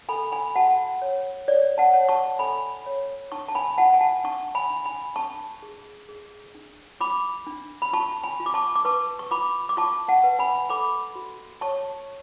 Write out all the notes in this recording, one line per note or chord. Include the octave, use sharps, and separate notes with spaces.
A4 G#5 B5
G#5 B5
F#4 F#5 A5
C#5
C#5 D5
F#5 A5
C#5
A5 C#6
A4 G#5 B5
C#5
D4 A5 C#6
A5
G#5 B5
F4 F#5 A5
G#5
F#5 A5
D4 A5 C#6
G#5 B5
D4
G#5 B5
D4 A5 C#6
G#4
G#4
D4
F4 B5 D6
D4
B5
F4 A5 C#6
G#5 B5
F4
D6
A5 C#6
D6
B4 A5 C#6
C#6
F4 B5 D6
D6
F4 A5 C#6
F#5 A5
B4
G#5 B5
A4 B5 D6
F#4
C#5 A5 C#6